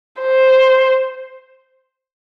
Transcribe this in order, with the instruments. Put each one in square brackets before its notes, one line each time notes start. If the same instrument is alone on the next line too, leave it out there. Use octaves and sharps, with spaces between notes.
[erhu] C5